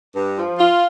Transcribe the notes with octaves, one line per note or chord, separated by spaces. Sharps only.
G2
F3
F4